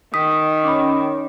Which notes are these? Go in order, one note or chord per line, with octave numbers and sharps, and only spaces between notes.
D#3 D#6 B6
C#4 B5 D6